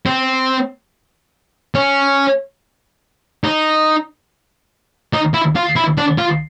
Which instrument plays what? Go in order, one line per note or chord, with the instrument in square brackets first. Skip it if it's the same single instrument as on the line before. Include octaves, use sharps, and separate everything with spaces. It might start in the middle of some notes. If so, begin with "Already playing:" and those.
[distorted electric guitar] C4
C#4
D#4
D#4
E4
F4
E4
D4
F4